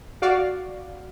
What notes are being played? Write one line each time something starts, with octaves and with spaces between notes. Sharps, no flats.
F#4 D5 F5